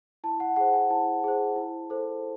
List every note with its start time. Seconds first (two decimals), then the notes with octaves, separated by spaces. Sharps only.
0.24 E4 A5
0.40 F#5
0.56 G#4 C5 F#5
0.74 G#5
0.90 E4 A5
1.24 G#4 C5
1.56 E4
1.90 A4 C5